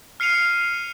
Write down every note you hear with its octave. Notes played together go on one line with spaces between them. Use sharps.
F6 C7 C#7 D#7 F7